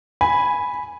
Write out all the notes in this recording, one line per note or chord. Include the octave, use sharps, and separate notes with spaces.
G#5 B5